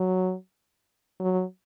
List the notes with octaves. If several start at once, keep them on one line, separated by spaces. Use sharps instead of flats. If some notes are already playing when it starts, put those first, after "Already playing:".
Already playing: F#3
F#3